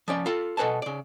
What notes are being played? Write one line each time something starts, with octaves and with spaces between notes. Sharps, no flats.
F3 C#4 D5
F4 A4
B2 A4 B4 G#5 A5
C#3 D5